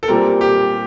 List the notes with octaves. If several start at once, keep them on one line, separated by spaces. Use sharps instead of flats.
A4
A#2 G3 C4 A#4
G4